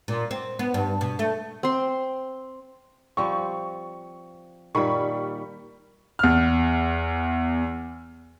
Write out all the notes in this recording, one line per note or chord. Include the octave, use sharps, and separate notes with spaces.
A#2
C4
B3
G2
B2
A3
C4 C6
F3 G3 C4 C#6
A#2 D#3 G3 B5 C#6
E2 F6